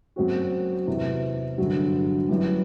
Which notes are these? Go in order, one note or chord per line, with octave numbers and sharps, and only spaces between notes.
F#1 F#2 F#3 C4 F#4
E2 C3 E3
G1 G2 D3 F#3
F#2 E3 G3